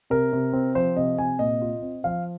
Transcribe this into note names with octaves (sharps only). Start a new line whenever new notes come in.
C3 A#4
C3
C4
F3 C5
C3 D#5
C3 G#5
A#2 D#5
F4
C4
F3 F5